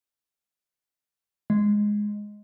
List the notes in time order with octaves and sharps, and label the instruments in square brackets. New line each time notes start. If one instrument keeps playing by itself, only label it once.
[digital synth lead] G#3